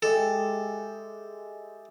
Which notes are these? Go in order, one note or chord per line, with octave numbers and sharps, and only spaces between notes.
G#3 G4 A4 E5